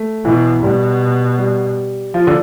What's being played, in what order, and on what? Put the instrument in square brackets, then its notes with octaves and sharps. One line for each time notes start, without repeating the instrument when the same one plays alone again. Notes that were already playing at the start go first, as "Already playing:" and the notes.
Already playing: [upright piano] A3
[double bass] B2 [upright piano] E3
[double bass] B2 [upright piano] G3
[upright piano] G3
F3
D3